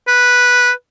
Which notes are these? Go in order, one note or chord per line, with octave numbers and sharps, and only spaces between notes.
B4